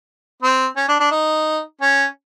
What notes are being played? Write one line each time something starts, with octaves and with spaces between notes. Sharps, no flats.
C4
C#4
D4
D4
D#4
C#4